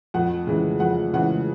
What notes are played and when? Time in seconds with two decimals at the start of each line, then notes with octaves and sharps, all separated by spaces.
0.14 F2 F#5
0.47 C#3 E3 G#3
0.80 F2 F#5
1.13 C#3 E3 G#3 F#5